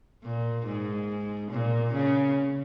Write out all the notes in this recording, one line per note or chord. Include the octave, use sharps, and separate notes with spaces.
A#2
G#2
A#2
C#3